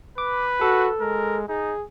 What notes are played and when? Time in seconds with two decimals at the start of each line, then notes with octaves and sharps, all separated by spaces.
0.18 B4 D6
0.61 F#4 A4
1.01 G#3 A#4
1.49 D#4 G#4